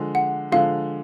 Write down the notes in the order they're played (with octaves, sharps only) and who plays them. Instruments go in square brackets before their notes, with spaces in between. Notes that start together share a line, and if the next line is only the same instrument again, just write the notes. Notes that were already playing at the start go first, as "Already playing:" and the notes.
Already playing: [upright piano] D3 F3 G#3
[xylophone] F#5
[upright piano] D3 F3 G#3 [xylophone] F5